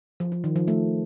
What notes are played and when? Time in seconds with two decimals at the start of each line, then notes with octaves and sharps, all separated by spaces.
0.20 F3
0.32 F3
0.44 D#3
0.56 F3
0.68 A3